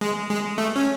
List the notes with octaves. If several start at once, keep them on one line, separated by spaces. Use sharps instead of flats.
G#3
G#3
A3
C#4